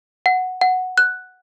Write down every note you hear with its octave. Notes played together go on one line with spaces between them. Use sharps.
F#5
F#5
F#6